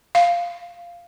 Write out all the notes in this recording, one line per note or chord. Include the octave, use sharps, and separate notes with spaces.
F5